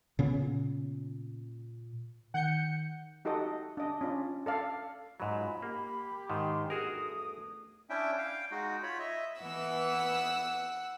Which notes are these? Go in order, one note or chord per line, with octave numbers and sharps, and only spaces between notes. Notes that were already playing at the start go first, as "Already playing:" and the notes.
A#2 C#3 B3 C#4
D#3 F#5 G6 C#7
D#4 F#4 G4 A4 D#5
D4 D#5
C#4 F4 D5
A4 D5 F5
G#2 F#3 G#3 C#4 F4 B5
A#3 G4
G#2 D#3 C6
E2 G2 A3 F#4 G#4 A#4 D#6
C#4 D4 E4 E5 G5
F5 G5
G#3 D#4 F#4
F4 C#5 B5
D#5 E5
E3 B3 F#5 E6